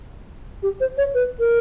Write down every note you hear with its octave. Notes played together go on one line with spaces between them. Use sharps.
G4
C5
C#5
B4
A#4